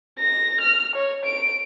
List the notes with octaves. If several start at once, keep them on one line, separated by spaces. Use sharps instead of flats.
A#6
F6
C#5
D7